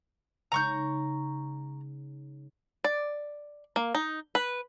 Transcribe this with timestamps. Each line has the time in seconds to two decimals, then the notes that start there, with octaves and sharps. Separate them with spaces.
0.52 C#3 G#3 D#4 A#5 C#6 G6
2.84 D5
3.76 A#3
3.95 D#4
4.35 B4